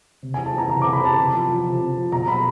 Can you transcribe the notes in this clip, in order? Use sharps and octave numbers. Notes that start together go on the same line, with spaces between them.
C3
G#5
E3
A5
E3 A#5
C3 A#5
D6
C3
B5
E3 A5
C3
F3
F3
C3
C3
F3
B2 A#5
F#3 B5